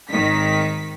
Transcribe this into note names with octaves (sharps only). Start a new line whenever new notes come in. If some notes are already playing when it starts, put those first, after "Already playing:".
G#1 D#3 B6